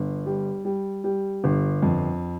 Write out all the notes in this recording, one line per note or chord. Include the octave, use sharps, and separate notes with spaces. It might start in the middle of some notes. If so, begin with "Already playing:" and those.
Already playing: G1
G3
G3
G3
G1
F2